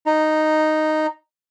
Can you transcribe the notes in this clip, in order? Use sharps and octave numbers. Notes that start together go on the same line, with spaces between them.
D#4